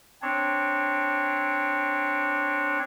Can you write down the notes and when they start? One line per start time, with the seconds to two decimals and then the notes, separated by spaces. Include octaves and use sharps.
0.22 C4 D4 C#5